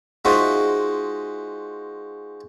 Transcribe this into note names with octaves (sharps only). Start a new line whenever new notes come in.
G#3 D#4 F4 F#4 C5 E5